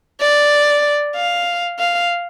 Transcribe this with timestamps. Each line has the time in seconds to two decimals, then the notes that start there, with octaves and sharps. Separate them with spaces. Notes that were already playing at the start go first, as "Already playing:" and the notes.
0.21 D5
1.15 F5
1.79 F5